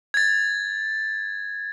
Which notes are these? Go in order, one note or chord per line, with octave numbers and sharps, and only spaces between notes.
G#6 A6